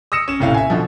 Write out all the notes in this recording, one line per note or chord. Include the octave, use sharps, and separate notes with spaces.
D#6 E6 A#6 C#7 E7
C#4 E7
F1 A#1 A2 C#4 E4 F5
E5 G#5
B2 D3 F3